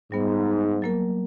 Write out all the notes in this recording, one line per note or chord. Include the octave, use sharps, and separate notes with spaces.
G#2 G3 B3
F#3 A#3 A#4